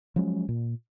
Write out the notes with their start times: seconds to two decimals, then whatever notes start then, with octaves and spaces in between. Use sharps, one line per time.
0.16 F3 F#3 G#3 C#4
0.49 A#2